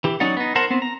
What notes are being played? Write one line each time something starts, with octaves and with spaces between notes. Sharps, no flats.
E3 G4
F#3 C#4 D#4 D5 F#5
B3 D#4
A#4 C5 F#5 A5
B3 C4
A#5